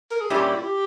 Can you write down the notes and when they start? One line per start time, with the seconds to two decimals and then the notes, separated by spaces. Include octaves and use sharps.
0.11 A#4
0.21 G#4
0.30 A#2 G3 C#4 E4 G4
0.55 E4
0.64 G4